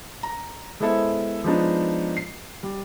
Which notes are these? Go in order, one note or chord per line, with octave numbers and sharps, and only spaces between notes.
A#5
G#3 B3 E4 A4 C5 E5
F3 G#3 B3 D4 D#4
C7
G3